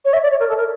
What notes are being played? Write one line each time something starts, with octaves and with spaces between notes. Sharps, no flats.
C#5
E5
D5
C#5
A#4
A4
A#4